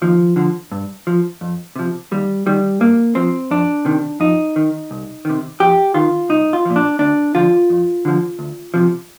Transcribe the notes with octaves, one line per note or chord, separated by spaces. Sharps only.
D#2 F3
D3 F3
G2
F3
F2
C3 F3
D#2 G3
D#3 G3
G2 A#3
F3 C4
F2 D4
C3 D#3
F2 D#4
D#3
C2
C3 D#3
F2 G4
D#3 F4
C2 D#4
F4
A#2 F3
D4
D2 D4
D3 F3 F4
F2
D3 F3
D2
C3 F3